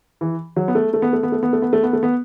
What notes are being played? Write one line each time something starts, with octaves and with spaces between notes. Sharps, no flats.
E3
F#3
B3
A3
A3
B3
A3
B3
A3
B3
A3
B3
A3
B3
A3
B3